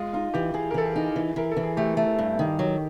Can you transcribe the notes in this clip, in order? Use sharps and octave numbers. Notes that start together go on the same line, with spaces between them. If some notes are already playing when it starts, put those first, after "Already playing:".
Already playing: G#3 F4
D#4 F4
E3 G4
E3 G#4
A#4
E3 A4
G#4
D#4
E3
E3 A#4
A4
E3
G#4
A3 G4
A3
G2
D#3
F#3